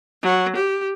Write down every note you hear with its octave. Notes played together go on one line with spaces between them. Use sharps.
F#3
G4